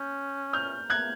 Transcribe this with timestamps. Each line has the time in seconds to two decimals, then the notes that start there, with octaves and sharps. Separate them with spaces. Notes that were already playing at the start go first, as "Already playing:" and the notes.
Already playing: C#4 G6
0.53 F6 G6
0.90 F#6 G#6